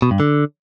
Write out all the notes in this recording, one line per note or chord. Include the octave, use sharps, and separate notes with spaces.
B2
G2
D3